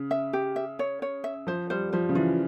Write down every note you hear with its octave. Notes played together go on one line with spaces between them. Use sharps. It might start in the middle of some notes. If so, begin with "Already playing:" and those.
Already playing: C#3
E5
G4
E5
C#5
C#5
E5
F3 C5
G3 C5
F3 C5
C#3
E3 F4